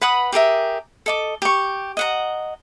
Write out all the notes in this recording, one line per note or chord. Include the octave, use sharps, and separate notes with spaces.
B4 F#5 B5 D#6
G4 G#4 A#4 E5
A4 D#5 D6
G4 C#6
D#5 F#5 A#5